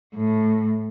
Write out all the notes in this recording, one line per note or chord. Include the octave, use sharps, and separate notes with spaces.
A2